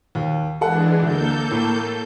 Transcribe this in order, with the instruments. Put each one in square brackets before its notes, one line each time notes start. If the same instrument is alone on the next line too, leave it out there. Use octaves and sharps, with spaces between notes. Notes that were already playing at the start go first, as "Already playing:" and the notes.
[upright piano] D#2
[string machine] E3 G#3 D4 [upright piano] A4 F#5
[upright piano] D2 [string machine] A#3 A4 G6
[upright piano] A2